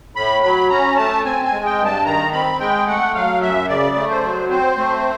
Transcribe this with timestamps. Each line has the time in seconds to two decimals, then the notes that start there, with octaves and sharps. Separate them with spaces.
0.15 A2 B5
0.43 F#3 B5
0.70 C#4 A#5
0.97 A3 A5
1.25 C4 G#5
1.45 G#5
1.51 G#3
1.65 G5
1.78 G2
1.85 A5
2.05 D#3 A#5
2.33 C4 B5
2.60 G#3 G5
2.87 A3 F#5
3.14 F#3 F5
3.41 F#2 E5
3.69 C#3 D5
3.96 A3
4.10 C5
4.23 F#3
4.50 C4 C5
4.77 A3